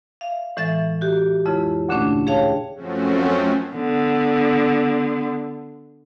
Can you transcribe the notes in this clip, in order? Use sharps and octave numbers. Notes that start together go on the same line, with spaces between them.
E5 F5
A2 E3 G#3 E5 A6
F#4 G4
F2 C#3 G#3 E4
D2 A#2 D3 A3 C#4 D4
G#4 C#5 F5 G5 A5
F#2 F3 A3 C4 C#4 F#4
D3 B3